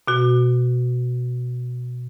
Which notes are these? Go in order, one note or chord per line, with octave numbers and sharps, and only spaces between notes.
B2 F#4